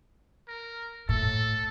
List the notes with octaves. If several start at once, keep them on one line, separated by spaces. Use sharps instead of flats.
A#4
A2 A4